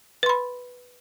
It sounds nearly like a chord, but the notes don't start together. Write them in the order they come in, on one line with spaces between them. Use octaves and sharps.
B4 C6 B5